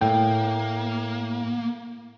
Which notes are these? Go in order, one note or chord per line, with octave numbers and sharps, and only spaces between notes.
A2 A#3 G5